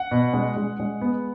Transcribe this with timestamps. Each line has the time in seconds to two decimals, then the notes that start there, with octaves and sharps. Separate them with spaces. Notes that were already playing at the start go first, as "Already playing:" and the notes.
Already playing: F#5
0.11 B2
0.34 G#3
0.57 G#3
0.80 G#3
1.01 B3